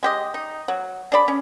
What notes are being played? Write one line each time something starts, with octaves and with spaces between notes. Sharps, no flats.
G#3 G4 D#5
D#4
F#3
D4 G#4 D5 B5
C#4